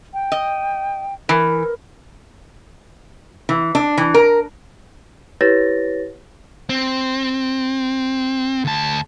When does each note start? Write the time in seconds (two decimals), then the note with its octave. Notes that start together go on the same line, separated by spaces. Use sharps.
0.14 G5
0.32 D#5
1.29 E3 A#4
3.49 E3
3.75 D4
3.97 E3
4.14 A#4
5.41 E4 G4 B4 C#5 A6 A#6
6.69 C4
8.65 D2 A5